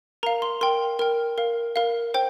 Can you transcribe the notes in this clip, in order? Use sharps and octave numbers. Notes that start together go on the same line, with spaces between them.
A#4 F5 A#5
C6
A#4 G5 C6
A#4 G5 F6
A#4 F5
A#4 F5
C5 G5